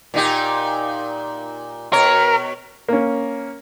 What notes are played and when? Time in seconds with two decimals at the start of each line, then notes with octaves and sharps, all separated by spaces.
0.14 A#2 D#4 G4
1.93 B2 A#4 C#5
2.88 A#3 C#4